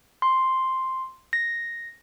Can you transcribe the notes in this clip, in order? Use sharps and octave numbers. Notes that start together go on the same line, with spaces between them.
C6
A#6